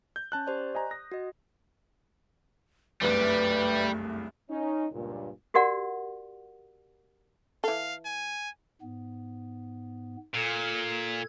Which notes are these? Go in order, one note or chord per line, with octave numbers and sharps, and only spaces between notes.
G6
C#4 A5 F#6
G4 C5 D5
D#5 G#5 A#5
D#6 A#6
F#4 D#5
F#1 C2 G2 G3 A3 B4
C#4 D#4
C#2 G2 A#2
F#4 G4 A#4 D5 F#5
E3 A4 F5
G#5
G#2 B3
A#2 A4 G#6